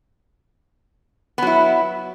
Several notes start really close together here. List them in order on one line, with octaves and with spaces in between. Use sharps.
B3 F#3 E4